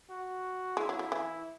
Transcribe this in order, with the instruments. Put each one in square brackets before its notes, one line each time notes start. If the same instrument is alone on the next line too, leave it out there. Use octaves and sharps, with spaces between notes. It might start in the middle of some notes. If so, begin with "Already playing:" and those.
[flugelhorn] F#4
[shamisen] G#3 [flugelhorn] E4
[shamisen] F#3
F#3
E3